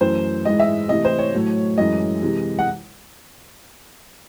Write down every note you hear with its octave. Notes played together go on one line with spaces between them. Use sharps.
F#2 E3 A3 C5
G#2 E3 G#3 D#5
E5
C3 E3 A3 D#5
C5
C#5
A2 F#3 A3
F#2 E3 G#3 D#5
C3 E3 G#3
F#5